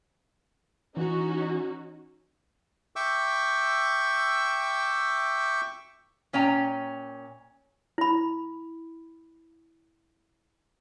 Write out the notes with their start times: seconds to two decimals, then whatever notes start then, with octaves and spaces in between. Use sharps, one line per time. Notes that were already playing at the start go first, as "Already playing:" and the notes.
0.97 E3 C#4 D#4 F#4
2.96 E5 G5 C#6 D6 E6
6.33 A#2 C#4 G5 A#5
7.98 E4 B5